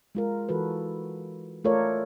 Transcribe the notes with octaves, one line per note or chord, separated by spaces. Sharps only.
G#3 F4 A#4
E3 F#4 A4 B4
A3 F4 A4 A#4 C#5 D5